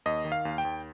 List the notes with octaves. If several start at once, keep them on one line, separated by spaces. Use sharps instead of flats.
D#2 D#5
D#3
F5
D#2
G5
D#2